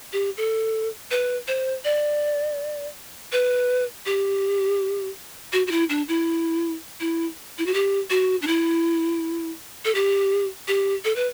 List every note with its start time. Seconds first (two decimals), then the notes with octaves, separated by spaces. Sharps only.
0.13 G4
0.37 A4
1.11 B4
1.48 C5
1.84 D5
3.32 B4
4.06 G4
5.53 F#4
5.67 F#4
5.71 E4
5.89 D4
6.08 E4
7.00 E4
7.58 E4
7.66 F#4
7.74 G4
8.10 F#4
8.42 D4
8.47 E4
9.85 A4
9.95 G4
10.68 G4
11.05 A4
11.16 B4